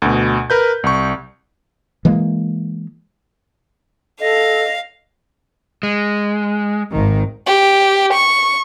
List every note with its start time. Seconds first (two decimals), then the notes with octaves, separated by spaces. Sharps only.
0.02 D2 B2
0.50 A#4 B4 G6
0.84 C2 C#6
2.05 E3 G#3 A#3
4.20 A4 D#5 F5
5.83 G#3
6.90 G#1 D#3
7.47 G4
8.14 C#6